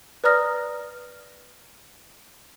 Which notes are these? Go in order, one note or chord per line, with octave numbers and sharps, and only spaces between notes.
B4 D5 A#5 D#6 F6 A#6